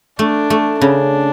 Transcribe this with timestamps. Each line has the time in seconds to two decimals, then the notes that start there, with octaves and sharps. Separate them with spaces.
0.19 A3 D4
0.50 A3
0.81 C#3 D4